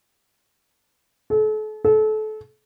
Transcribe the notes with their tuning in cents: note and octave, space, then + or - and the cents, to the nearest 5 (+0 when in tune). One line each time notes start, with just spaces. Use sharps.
A4 -40
A4 -30